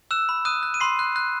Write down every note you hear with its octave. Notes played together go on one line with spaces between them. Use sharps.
E6 F#6 E7
B5
D#6 F#6 D#7
F#6
D#7
B5 C6 C7
F#6
F#6